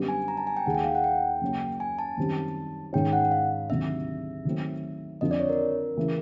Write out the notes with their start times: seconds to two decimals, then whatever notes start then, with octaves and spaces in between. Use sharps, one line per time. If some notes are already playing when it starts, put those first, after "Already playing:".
Already playing: F#2 D3 G3 B3
0.09 G#5
0.28 A#5
0.37 A5
0.47 G#5
0.57 G5
0.66 D#2 D#3 G#3 F#5
0.75 G5
0.84 F5
0.95 F#5
1.04 G5
1.41 F#2 C#3 F#3 A#3 C#4
1.80 G#5
1.99 A5
2.17 F#2 D#3 G3 C4
2.93 G#2 D#3 G#3 C#4 G5
3.13 F#5
3.31 F5
3.70 D2 C3 D#3 F#3 E5
4.45 D#3 F#3 A3 C4
5.21 F2 D3 F3 D#5
5.31 D5
5.40 C#5
5.49 A#4
5.96 C#3 E3 A3